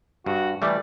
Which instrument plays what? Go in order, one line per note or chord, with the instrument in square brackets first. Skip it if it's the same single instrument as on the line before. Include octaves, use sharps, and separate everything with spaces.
[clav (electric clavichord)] G2 [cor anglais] F#4
[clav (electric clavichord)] E3 G3 A3 [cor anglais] D5